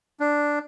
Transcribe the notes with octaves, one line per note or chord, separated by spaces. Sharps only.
D4